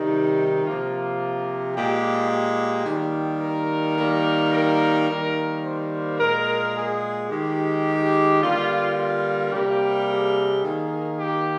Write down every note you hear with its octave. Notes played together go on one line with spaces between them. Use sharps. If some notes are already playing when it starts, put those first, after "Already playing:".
Already playing: C3 D#3 G3 D#4
C3 F3 A#3 F4
A#2 G#3 G4
G4
D#3 G3 A#3
A#4
D#3 G3 A#3
A#4
D#3 G3 A#3
C5
A#2 G#3 A#4
G#4
D#3 G#3 G4
D3 G3 A#3 F4
F4
C3 G3 A#3 G4
G#4
D#3 A#3
G4